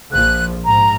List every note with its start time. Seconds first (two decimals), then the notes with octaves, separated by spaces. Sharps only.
0.12 A#1 F3 F#6
0.65 G#2 A#5